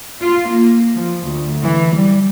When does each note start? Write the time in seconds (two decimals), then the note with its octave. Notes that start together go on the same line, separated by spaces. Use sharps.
0.19 F4
0.48 A#3
0.94 F3
1.26 D2
1.63 E3
1.94 G3